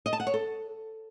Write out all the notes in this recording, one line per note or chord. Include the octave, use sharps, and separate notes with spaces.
D#5
A5
F#5
C#5
A4